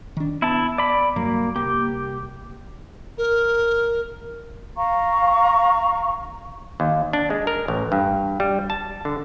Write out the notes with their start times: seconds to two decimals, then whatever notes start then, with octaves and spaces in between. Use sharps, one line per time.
0.17 D#3 D4
0.42 B3 E4 A5
0.78 D5 B5
1.16 G2 F#3 A#3
1.56 C2 A#3 G4
3.18 A#4
4.76 F5 A#5 C#6
6.80 D#2
7.13 D4
7.30 G#3
7.47 A#4
7.68 A1
7.92 G2
8.40 G3
8.70 A5
9.05 D3